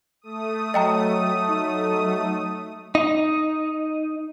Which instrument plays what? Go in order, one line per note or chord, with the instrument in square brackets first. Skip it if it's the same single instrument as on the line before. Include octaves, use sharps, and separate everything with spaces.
[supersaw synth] A3 D#6
[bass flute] F#3 [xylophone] D#5 G5 A#5
[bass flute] F#3 [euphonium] D#4
[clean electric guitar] D#4